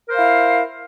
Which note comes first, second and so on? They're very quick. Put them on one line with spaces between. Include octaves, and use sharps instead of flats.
A#4 C5 F5 E4